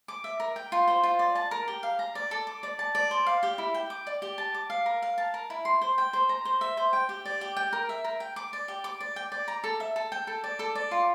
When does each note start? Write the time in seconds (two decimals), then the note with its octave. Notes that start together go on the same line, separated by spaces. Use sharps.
0.08 D6
0.24 E5
0.40 A#4
0.56 G5
0.72 F4
0.88 C5
1.04 F4
1.19 D5
1.35 A5
1.51 A#4
1.68 G4
1.83 F5
1.99 A#5
2.15 D5
2.31 A4
2.47 D6
2.63 D5
2.79 A5
2.95 D5
3.11 C5
3.26 F5
3.43 G4
3.58 E4
3.74 G5
3.90 D6
4.07 D5
4.22 G4
4.38 A5
4.54 D6
4.70 F5
4.86 A#4
5.02 F5
5.18 A5
5.34 A#4
5.50 E4
5.65 C6
5.82 C5
5.98 G5
6.13 C5
6.29 A#5
6.45 C5
6.61 E5
6.77 C5
6.93 G5
7.09 G4
7.25 D5
7.41 G4
7.57 G5
7.73 A#4
7.89 E5
8.04 A#4
8.20 G5
8.36 D6
8.53 D5
8.68 G4
8.84 D6
9.00 D5
9.16 G5
9.32 D5
9.48 A#5
9.64 A4
9.80 E5
9.96 A4
10.12 G5
10.27 A4
10.44 D5
10.59 A4
10.75 D5
10.91 F4